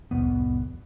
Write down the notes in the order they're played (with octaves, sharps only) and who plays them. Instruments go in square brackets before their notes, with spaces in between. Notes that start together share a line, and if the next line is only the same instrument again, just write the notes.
[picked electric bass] D1 C2 F2 B3